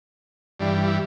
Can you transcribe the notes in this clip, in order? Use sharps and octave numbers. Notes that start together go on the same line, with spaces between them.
G2 E3 G3 D4
E4